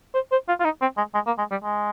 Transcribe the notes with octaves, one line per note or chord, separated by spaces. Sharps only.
C5
C5
F4
F4
D#4
C4
G#3
G#3
A#3
G#3
G3
G#3